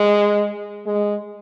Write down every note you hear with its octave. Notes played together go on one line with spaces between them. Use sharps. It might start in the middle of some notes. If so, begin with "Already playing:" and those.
Already playing: G#3
G#3